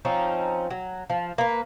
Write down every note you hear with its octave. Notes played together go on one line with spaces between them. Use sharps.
F3 C4 C#4 D#4
F#3
F3
A#3 B4